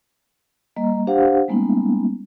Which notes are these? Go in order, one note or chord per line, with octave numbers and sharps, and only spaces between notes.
G3 A#3 D#5 A#5
D4 G4 C5 F5 F#5
G3 G#3 A#3 B3 C#4 D#4